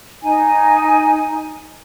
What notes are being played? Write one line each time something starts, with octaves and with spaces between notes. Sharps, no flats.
D#4 G#5